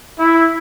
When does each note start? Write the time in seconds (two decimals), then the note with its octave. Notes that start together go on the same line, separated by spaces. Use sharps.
0.18 E4